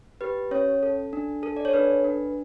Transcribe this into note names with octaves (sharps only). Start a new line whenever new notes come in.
G4 B4
C#4 C#5
A4
D4
A4
D5
C#5
D4 B4
D4